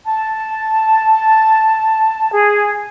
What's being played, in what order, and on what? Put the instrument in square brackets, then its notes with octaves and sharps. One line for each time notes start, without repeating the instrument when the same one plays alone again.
[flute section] A5
G#4